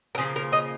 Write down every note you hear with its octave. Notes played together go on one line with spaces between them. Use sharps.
A#4
C#3 F3 A#3 G#4
A#4
D#5